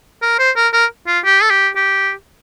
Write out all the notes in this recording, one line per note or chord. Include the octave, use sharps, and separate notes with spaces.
A#4
C5
A#4
A#4
F4
G4
A4
G4
G4